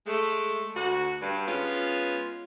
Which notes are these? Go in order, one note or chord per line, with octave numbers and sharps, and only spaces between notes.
G#3 A3
D2 F#4
G2
G#3 B3 C#4 F4